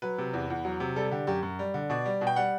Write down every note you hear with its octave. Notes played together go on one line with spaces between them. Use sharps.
F#3 B4
C3
E2
E2
F#3
C3
G3 A4
D3 G4
F#2 G4
F#2
G3
D3
B2 D5
G3
B2
G5
G3 F#5